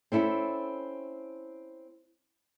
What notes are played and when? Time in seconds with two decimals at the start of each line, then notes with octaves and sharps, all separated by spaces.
0.12 C4 C#4 E4 A4